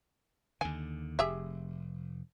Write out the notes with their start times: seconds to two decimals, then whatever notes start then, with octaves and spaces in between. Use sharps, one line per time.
0.61 D#2 D3 G#5
1.19 F1 G4 G#4 E5